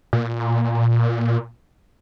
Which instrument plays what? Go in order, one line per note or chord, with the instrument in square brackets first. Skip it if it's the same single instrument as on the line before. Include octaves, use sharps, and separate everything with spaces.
[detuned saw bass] A#2